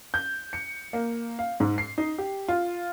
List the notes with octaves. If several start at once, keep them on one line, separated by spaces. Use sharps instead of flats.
G6
C#7
A#3
F5
G#2
C7
D#4
G4
F4